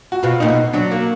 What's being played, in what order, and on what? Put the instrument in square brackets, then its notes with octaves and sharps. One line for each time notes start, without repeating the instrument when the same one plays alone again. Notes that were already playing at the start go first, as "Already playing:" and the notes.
[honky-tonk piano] F#4
[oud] B2 [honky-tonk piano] F4
[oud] A#2 [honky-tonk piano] D#4
[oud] B2
[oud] F#3 [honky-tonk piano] D4
[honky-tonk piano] A#3